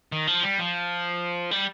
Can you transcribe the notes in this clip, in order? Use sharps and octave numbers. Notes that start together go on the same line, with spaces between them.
D#3
F3
G3
F3
G3